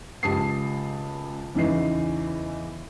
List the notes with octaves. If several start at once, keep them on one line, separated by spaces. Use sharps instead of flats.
C#2 G4 A5 D#6 C7
E2 C#3 E3 D#4 C7